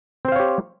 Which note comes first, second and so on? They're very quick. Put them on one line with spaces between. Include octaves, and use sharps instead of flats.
C4 C5 F5 C#5 G4